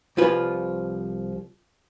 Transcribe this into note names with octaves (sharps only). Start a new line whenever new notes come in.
C2 F3 F4 B4 G#5